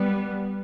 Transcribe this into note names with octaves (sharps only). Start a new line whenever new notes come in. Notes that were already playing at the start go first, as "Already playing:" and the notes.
Already playing: G3 B3